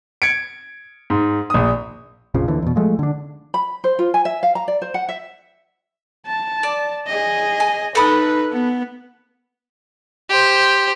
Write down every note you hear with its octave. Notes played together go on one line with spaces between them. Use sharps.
G#6 C#7 D7
G#2
A#1 D#6
A#1 F2 C#3 F3
D#2 D3 E3
E2 B2
F3 G#3 A3
D3 D4
B5
C5
F4
G#5
E5
F5
A#5
D5
C5
F#5
E5
A5
D5
G#4 D#5
G#5
D#4 A4 B4 B5 D#6
B3
G4 C5